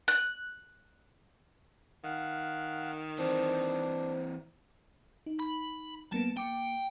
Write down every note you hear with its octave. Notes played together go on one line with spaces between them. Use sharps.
F#6
D#3 F5 F#5
E3 C4 D4 C5
D#4
B5
F#3 A#3 B3 A5
A#3 G5 D6 C#7